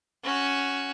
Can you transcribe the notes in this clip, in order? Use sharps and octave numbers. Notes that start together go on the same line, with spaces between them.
C#4 F#4